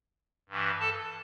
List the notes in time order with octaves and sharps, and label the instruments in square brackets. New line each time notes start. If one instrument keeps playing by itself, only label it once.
[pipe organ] G2 E3
A4 A5